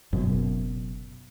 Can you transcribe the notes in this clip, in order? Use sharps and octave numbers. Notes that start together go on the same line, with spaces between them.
F#1 F#2 B2